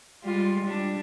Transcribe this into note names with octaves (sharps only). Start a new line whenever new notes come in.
G3 G#3 F4
G3 D4